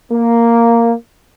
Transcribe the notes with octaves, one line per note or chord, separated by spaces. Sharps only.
A#3